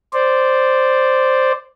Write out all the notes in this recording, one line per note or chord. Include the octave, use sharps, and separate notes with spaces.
C5 D5